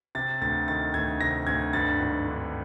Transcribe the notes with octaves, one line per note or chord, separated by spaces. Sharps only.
C3 A6
D2 A6
D#3 A6
D2 G#6
C3 A#6
D2 G#6
G2 A6
G#1
D3